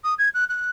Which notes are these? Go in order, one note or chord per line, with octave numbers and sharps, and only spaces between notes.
D#6
G#6
F#6
F#6